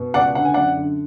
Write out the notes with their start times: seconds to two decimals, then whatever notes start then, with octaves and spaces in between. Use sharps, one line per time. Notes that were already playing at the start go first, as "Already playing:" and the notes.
Already playing: B2
0.14 C#2 D5 F#5
0.35 D3 F#5
0.45 G#5
0.54 F#2 D5 F#5
0.77 D3